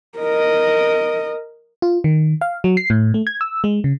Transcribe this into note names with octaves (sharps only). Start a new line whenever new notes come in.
A#4 D#5
F4
D#3
F5
F#3
C7
A2
A3
G#6
E6
G#3
C#3